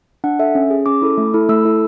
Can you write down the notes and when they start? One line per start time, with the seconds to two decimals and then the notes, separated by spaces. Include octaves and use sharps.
0.24 D4 F#5
0.39 A4 E5
0.55 C#4
0.70 G#4
0.86 C#4 D6
1.02 E4 A4
1.18 A3
1.34 E4 A4
1.49 A3 E6
1.65 E4 A4